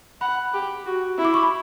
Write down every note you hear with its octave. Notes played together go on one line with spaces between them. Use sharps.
F#5 B5
G4
F#4
E4
D6
C#6
B5